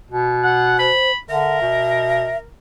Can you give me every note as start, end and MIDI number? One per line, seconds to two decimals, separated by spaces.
0.11 0.90 47
0.44 0.77 78
0.79 1.12 72
0.79 1.16 83
1.30 1.60 50
1.30 2.48 70
1.30 2.37 76
1.61 2.31 47